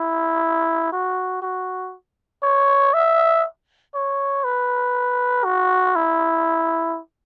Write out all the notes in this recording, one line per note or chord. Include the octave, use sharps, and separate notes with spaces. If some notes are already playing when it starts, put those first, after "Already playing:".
Already playing: E4
F#4
F#4
C#5
E5
C#5
B4
F#4
E4